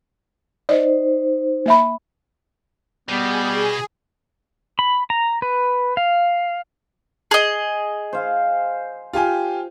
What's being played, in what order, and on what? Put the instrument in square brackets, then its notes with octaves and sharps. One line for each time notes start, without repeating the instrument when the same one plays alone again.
[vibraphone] D#4 C5 [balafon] D5 D#5
[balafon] A#3 E5 B5
[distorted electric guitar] B2 [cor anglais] G3 [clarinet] B3 [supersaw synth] G#4
[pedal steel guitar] B5
A#5
B4
F5
[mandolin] G#4 D#5
[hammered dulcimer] C5 F5
[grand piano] F4 G4 G#5